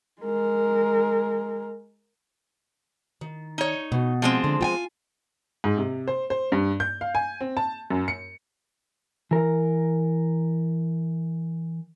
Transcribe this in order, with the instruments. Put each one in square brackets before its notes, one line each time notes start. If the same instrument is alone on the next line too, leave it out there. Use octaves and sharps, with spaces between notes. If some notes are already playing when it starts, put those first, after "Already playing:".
[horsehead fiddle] G#3 A#4
[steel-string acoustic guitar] D#3
[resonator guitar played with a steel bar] D#4 C#5
[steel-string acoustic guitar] B2
[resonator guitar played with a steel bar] F3 G#3 C4
[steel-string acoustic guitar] D3
F4 G5 G#5
[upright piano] G#2
C3
C5
C5
G2
G6
F5
G#5
C4
A5
F#2
C#7
[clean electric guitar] E3 A#4